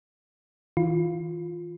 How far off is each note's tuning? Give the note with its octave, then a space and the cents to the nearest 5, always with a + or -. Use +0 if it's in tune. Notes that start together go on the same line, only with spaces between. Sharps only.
E3 -30 F4 +0